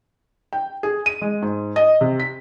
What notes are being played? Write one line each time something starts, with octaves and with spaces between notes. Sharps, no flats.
G5
G#4
D#7
G#3
G#2
D#5
C3
B6